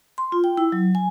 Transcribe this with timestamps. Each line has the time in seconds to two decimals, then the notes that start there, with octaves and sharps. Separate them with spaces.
0.18 C6
0.32 F4
0.44 G5
0.57 E4
0.72 F#3
0.95 G#5